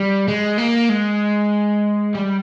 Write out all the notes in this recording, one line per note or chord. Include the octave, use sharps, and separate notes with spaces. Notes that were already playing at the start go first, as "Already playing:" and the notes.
Already playing: G3
G#3
A#3
G#3
G3